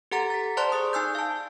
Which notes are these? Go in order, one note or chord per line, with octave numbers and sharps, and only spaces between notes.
G4 A4 F#5 A#5 A6
A6 B6
C5 D5 A5 C6 F#6
G#4 D#6
D#4 G#5 E6 G6
F5 A5